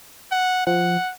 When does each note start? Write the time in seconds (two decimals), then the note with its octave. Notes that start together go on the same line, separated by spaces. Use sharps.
0.32 F#5
0.67 F3 F#5